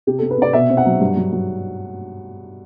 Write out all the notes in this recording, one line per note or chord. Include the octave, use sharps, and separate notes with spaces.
C3 G4
A4
C3
B4
C3 D5
B2 E5
C4
F#5
F#3
G2
F#3
F#3